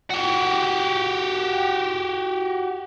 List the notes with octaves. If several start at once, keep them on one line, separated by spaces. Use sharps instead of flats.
F#4 G4